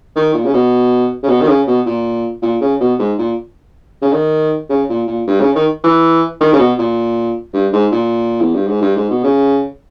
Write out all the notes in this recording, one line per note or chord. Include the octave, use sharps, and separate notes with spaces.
D#3
A#2
C#3
B2
C#3
B2
D#3
C#3
B2
A#2
A#2
C#3
B2
G#2
A#2
C#3
D#3
C#3
A#2
A#2
G2
C#3
D#3
E3
D#3
C#3
B2
A#2
G2
G#2
A#2
E2
G2
G#2
G2
G#2
B2
C#3